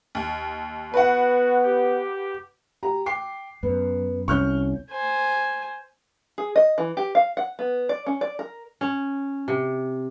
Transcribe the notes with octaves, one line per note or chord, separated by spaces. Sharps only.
D#2
B3 F#4 B4 F#5
G4
G4 A#5
G5 D6 C7
F#2 B3
C2 C#4 C#6 F6 G6
C5 G#5
G#4
D#5
E3
G4
F5
F#5
B3
D5
C#4
D5
A#4
C#4
C3